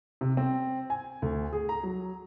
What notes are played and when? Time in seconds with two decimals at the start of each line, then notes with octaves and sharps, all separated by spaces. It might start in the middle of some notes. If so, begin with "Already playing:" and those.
0.21 C3
0.37 C4
0.90 G#5
1.22 D2
1.53 G#4
1.69 A#5
1.83 F#3